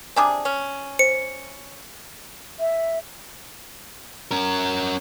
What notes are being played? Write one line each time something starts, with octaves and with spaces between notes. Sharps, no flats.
C3 D4 G#4 G#5 A#5 D6
C#4
C5 C#7
E5
C#4 A#4